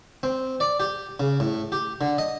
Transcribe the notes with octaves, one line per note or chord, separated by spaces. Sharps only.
C4
D5
G4
C#3
A2
G4
D3
D#5